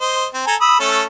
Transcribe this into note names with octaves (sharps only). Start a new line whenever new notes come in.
C5 D#5
C4
A4 G#5 A#5
B5 D#6 E6
A3 C#4 A4